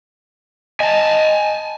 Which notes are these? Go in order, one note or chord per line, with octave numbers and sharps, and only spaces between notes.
D#5 G#5 A5